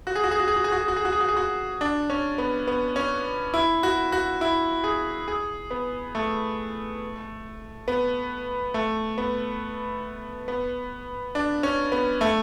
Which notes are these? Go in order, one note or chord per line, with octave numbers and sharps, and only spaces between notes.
F#4
G#4
F#4
G#4
F#4
G#4
F#4
G#4
F#4
G#4
F#4
G#4
F#4
G#4
F#4
G#4
F#4
D4
C#4
B3
B3
C#4
E4
F#4
F#4
E4
G#4
G#4
B3
A3
B3
A3
B3
B3
D4
C#4
B3
A3